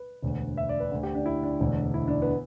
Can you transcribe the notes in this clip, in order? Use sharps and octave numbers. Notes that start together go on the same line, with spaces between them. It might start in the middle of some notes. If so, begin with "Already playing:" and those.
Already playing: B4
E1 D2 D3
E5
D5
B4
D2 D3
G4
D4
E4
D4
E1 D2 D3
E4
D4
B3